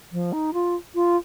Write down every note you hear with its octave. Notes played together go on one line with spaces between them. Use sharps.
F3
D#4
F4
F4